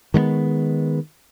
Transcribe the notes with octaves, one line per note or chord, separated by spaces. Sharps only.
D#3 G#3 A3 B3